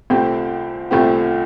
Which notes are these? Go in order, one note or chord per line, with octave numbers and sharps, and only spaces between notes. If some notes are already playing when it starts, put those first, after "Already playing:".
C2 A#2 A3 C4 G4
C2 A#2 A3 C4 G4